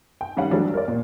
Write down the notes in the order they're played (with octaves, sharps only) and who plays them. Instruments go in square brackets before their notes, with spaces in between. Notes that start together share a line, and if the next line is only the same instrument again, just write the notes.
[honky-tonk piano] G5
D#3 G3 C#4 F5 F#5
E3 F#3 G3 A3 D4
A#4 C#5 D5
A#2